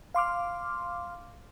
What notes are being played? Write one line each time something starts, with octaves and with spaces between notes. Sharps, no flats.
F5 C6 D6 F6